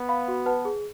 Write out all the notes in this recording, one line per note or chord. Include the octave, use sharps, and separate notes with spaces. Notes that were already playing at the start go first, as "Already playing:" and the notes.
Already playing: B3
F5 B5
F#4
B4 F#5 A5
G#4